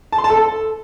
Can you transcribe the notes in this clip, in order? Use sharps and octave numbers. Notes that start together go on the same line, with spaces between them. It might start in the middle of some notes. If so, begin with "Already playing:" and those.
A5
C6
A5
A4